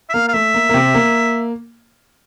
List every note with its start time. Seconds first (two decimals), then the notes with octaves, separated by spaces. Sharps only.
0.10 E5
0.14 A#3 F5
0.28 F5
0.34 A3 E5
0.54 A#3
0.69 A#3
0.74 C3 C4
0.94 A#3